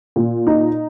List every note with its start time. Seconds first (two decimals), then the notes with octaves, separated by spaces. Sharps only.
0.16 A#2
0.47 D#4